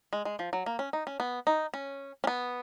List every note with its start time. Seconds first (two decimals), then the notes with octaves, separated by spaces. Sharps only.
0.13 G#3
0.25 G#3
0.39 F3
0.53 F#3
0.66 A#3
0.79 C#4
0.93 D#4
1.07 C#4
1.20 B3
1.47 D#4
1.74 C#4
2.24 C#4
2.27 B3